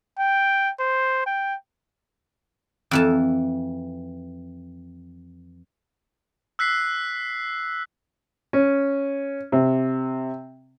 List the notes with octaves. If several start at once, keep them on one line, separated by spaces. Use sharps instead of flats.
G5
C5
G5
F2 E3 A5
E6 F#6 B6 C7
C#4
C3